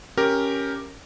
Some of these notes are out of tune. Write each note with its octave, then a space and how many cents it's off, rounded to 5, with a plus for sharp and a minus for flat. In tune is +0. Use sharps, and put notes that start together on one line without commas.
C#4 +0 G4 +0 A#4 +0